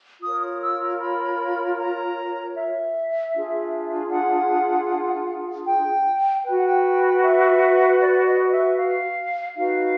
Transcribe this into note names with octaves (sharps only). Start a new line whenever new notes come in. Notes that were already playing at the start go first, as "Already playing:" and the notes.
F4 A#4 C#5 D#6
D#6
E6
B5
A#5
E5
D4 F4 G#4
F#5
G5
F#4 B4 G5
F#5
G5
E5
D5
D#5
E5
F5
D#4 F#4 B4 F5